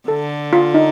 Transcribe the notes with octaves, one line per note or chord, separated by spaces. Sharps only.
D3 A4
F4
D#4